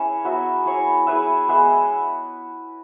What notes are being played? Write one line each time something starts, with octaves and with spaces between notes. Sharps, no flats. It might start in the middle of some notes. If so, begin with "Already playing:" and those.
Already playing: C#4 E4 G#4 B4 C#5 E5
F#3 B3 F#4 E5
E4 G#4 C#5
E4 G#4 B4 E5
G#3 B3 G#4 E5